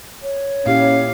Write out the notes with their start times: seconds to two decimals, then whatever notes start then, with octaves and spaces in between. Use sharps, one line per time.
0.22 C#5
0.66 A#2 C#4 E4 G4 F5